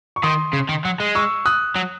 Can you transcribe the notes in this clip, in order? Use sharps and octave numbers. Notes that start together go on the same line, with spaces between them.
C#6
D#3 C6 D#6
C#3
D#3
F#3
G#3
C#6 E6
D#6 F#6
F#3